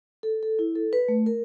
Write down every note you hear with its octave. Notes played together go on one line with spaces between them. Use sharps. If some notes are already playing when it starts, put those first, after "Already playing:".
A4
A4
E4
A4
B4
A3
A#4